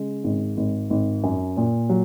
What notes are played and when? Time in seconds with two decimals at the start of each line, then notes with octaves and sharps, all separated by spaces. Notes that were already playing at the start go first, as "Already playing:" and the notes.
Already playing: C#3 G#3
0.24 G#1
0.57 G#1
0.90 G#1
1.24 F#2
1.57 A#2
1.89 F#3